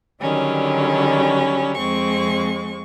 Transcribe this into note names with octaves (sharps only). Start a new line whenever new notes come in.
D3 D#3 F#3 G3 C#4
F2 G#3 C4 C#6